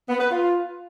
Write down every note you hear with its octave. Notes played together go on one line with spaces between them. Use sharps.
B3
B4
F4